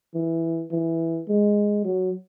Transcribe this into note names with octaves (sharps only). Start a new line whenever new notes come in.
E3
E3
G#3
F#3